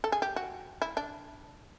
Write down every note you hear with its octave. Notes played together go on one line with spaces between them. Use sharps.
A4
G#4
G4
F#4
E4
D4